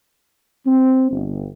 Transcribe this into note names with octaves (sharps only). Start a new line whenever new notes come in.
C4
G1